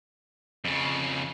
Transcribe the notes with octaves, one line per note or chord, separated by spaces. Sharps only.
F2 C#3